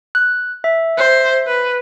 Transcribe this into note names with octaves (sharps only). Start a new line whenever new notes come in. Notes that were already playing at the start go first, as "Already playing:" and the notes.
F#6
E5
C5
B4